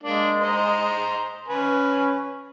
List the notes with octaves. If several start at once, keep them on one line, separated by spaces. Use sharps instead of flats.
G#3 A#3 D4 D5
C5 D#5 A#5
C#4 B4 G#5